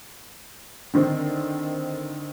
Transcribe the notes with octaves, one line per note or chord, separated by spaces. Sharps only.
D3 D#3 C4